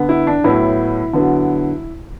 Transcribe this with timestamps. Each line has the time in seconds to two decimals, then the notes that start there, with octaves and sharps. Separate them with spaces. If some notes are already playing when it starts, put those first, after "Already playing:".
Already playing: D3 B3
0.09 E4
0.27 D4
0.44 A2 F#3 B3 E4
1.13 D3 F#3 B3